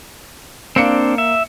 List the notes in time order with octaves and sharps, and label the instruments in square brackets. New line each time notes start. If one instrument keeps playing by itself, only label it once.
[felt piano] A#3 F5 C#7 [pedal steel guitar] C4 D4
[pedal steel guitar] E5